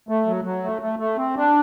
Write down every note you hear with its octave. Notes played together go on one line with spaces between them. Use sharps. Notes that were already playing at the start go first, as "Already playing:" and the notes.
A3
F#3
F#3
A3
A3
A3
C4
D4